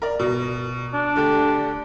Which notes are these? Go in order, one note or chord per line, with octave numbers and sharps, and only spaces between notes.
A#4 D5
B2
D4
D3 A3 G4